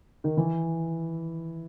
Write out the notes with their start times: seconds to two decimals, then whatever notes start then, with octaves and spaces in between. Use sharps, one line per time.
0.24 D#3
0.37 E3